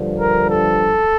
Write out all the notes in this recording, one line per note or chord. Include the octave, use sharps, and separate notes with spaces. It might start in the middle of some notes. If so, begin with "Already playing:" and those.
Already playing: G2 D3 F3
A#4
A4